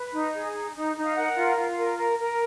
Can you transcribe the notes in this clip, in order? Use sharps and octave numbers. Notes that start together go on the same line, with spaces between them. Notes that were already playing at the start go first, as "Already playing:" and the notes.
Already playing: B4
D#4
G#4
D#4
D#4
D#4
F5
A#4 F#5
F4
F4
A#4
A#4
A#4